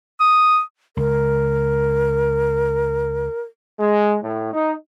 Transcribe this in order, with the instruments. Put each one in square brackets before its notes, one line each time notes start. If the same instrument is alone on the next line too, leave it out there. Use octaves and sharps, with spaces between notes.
[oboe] D#6
[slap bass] C#2 [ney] A#4
[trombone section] G#3
A2
D#4